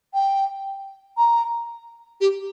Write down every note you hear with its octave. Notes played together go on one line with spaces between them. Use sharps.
G5
A#5
G4